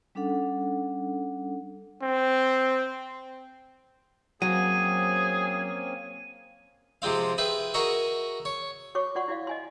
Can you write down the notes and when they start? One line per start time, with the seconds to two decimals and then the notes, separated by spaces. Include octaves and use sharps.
0.15 G3 C#4 D4 A4 F#5
2.02 C4
4.42 F#3 A#3 C4 C#4 G#4 D#7
7.02 C3 F3 G#3 C4 F5
7.38 G#4 B4 E5 G5
7.74 F#4 G#4 A#4 D#5 E5 C#6
8.45 C#5
8.95 F#4 C#5 C#6 D6
9.15 F4 F#4 D5 F#5 C6 C#6
9.28 E4 F#4 D5 F5
9.47 D#5 G#5 C6